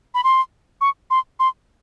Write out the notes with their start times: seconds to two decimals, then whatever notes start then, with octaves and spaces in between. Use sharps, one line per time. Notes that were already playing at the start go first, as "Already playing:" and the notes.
0.14 B5
0.24 C6
0.81 C#6
1.10 C6
1.39 C6